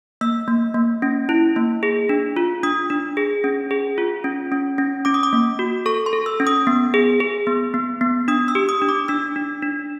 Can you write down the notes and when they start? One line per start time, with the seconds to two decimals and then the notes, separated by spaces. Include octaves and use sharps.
0.21 A#3 E6
0.48 A#3
0.74 A#3
1.02 C#4
1.29 E4
1.56 A#3
1.83 G#4
2.09 D4
2.36 F4
2.63 D4 D#6
2.90 D4
3.17 G#4
3.44 C#4
3.71 G#4
3.98 F4
4.24 C#4
4.52 C#4
4.78 C#4
5.05 C#4 D6
5.14 D#6
5.23 D6
5.33 A#3
5.59 F#4
5.86 A4 C#6
6.06 C6
6.13 A4
6.26 E6
6.40 C#4
6.47 D#6
6.67 B3
6.94 G#4
7.20 G#4
7.47 B3
7.74 B3
8.01 B3
8.28 D4 D#6
8.48 E6
8.55 G4
8.69 D#6
8.82 D4
8.89 D6
9.08 D4 E6
9.36 D4
9.62 D4